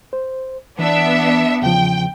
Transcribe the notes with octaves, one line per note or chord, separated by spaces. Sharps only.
C5
E3 B3 D4 E5
E2 C#3 F3 G5